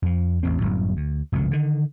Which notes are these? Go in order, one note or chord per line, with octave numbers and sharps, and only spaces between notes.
F2 F3
A1 E2 C4
G1 F#2 A2
D2
F1 C#2 F#2 D3
D3 D#3